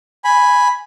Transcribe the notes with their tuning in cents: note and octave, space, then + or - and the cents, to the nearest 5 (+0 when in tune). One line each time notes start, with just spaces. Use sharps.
G#5 +0 B5 +0